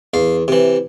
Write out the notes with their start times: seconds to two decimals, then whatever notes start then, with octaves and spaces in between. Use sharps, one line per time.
0.14 E2 F5
0.48 C3 E3